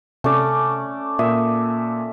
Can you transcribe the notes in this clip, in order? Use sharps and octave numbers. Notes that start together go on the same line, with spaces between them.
C3 A3 C#4 D5
A#2 A#3 E5 D#6